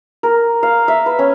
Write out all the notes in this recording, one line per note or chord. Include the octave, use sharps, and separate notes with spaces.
A#4
F5
E5
B4
C#4